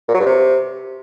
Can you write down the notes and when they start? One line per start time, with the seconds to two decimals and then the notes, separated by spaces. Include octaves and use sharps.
0.08 A#2
0.14 F#3
0.20 G2
0.26 C3